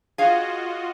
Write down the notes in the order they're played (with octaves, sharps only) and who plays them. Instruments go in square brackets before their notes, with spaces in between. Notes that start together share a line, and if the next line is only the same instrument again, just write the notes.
[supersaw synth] F4 F#4 D#5 [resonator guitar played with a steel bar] G#4 F5